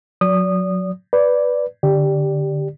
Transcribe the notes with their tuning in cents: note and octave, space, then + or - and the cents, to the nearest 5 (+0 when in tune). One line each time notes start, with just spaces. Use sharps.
F#3 -20 D5 -35 D#6 -20
B4 +0 D5 -5
D3 +0 G4 +0 D5 +0